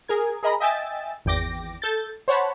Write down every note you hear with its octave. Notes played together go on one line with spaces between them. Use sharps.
G#4 A#4 G#6
G#4 A#4 D#5 A#5 B5
D#5 E5 G5 G#5 E6 A6
G#1 E2 G5 D6 A#6
A4 G6 A6
C5 C#5 F#5 A5 B5